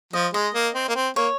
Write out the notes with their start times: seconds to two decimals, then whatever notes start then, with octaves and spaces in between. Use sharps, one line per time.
0.13 F3 D#5
0.34 G#3 D#5
0.54 A#3
0.75 C4
0.89 A#3
0.95 C4
1.16 A#3 C#5